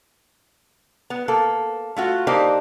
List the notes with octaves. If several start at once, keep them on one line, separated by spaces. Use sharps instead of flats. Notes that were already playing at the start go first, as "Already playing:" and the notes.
B3
A#3 A4
A3 F4 F#4
A#3 D4 D#4 G4 C5